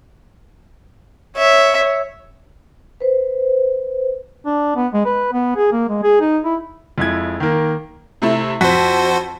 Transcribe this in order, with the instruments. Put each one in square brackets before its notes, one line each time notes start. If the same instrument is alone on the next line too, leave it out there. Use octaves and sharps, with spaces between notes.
[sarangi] C#5 [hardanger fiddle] E5
[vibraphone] B4 C5
[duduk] D4
B3
G#3
B4
B3
G#4
A#3
G#3
G#4
D#4
E4
[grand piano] F2 G#3 E4 G#6
D#3 A#3
[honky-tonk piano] C3 A3 E4
[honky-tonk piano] F2 B6 [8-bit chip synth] F#4 C5